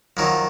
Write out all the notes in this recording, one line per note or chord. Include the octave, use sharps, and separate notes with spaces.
F2 D#3 F#3